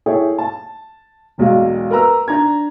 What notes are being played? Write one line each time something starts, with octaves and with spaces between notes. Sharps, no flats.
E4 G#4 A4 C#5 G5
A5
E1 B1 G#3 F5
A#4 B4 A#5 E6
D4 A#5 G#6